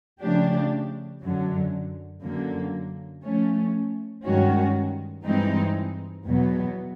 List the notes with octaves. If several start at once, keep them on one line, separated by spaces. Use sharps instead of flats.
C#3 F3 A3 D4 G4
F#2 D3 F#3
F#2 D3 F#3 A#3
F3 A3 C#4
G2 D#3 G#3 C#4 F#4
G2 E3 G#3 C4 D#4
E2 B2 F#3 B3